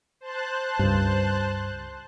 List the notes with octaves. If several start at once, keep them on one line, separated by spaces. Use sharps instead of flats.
C5 A5 F#6
C#2 G2